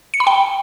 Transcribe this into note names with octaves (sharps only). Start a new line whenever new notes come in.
C#7
B5
G5